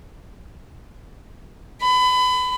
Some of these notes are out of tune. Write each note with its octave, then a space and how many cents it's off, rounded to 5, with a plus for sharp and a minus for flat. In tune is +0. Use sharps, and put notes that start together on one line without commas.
B5 +25